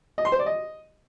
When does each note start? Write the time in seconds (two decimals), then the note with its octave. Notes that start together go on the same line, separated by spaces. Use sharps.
0.18 D#5
0.25 C6
0.32 C5
0.39 D5
0.46 D#5